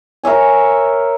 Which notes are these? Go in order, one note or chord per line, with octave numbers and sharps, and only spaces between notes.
A#4 C#5 E5 G#5